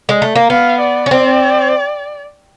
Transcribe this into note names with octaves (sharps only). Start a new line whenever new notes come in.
G#3
A3
A#3
B3 F5
D5
C#4
C4